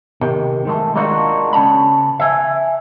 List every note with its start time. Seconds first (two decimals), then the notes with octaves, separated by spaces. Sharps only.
0.21 C3 D#3
0.65 D#3 G#3 A3
0.95 G#3 A#3 D4 D#4 F4 F#4
1.53 C#3 C#4 A5 B5
2.20 E5 G#5